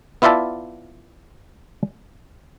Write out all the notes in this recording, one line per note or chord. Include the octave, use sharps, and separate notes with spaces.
B3 E4 F4 D5 E5 A5